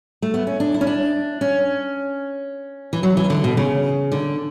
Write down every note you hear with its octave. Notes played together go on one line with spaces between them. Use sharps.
A3
B3
C#4
D4
E4
C#4
D4
C#4
E3
F#3
E3
D3
B2
C#3
D3